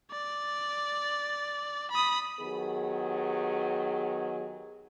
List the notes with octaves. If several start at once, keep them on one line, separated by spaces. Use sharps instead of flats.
D5
B5 D#6
D#3 F#3 B3 G4 G#4